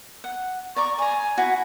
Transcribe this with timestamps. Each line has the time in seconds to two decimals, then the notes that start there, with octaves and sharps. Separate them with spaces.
0.24 F#5
0.76 D5 A#5 C#6 D6
0.99 D5 G#5 A#5
1.38 E4 F#4